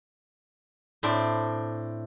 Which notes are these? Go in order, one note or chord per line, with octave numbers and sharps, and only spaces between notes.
A2 C4 D4 B5